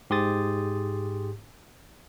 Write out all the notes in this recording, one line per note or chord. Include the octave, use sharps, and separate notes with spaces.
G#2 G4 G#4 C6 D#6 A6